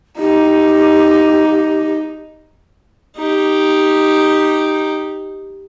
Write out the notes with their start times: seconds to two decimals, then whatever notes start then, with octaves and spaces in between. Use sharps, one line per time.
0.19 D#4 G4
3.18 D#4 G4